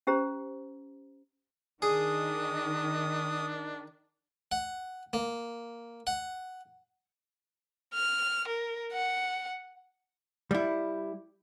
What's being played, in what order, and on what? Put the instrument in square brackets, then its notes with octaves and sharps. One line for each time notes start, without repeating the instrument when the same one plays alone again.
[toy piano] C#4 G4 C5 A#5
[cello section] D#3 [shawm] D4 [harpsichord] G#4 [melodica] D#6
[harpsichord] F#5
A#3
F#5
[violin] F6
A#4
F#5
[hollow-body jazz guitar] G3 E4